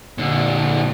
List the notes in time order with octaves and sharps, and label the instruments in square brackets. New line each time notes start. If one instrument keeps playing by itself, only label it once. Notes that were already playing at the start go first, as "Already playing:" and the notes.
[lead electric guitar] A#2 D3